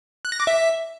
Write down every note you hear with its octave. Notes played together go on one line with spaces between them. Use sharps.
F#6
A#6
D6
E5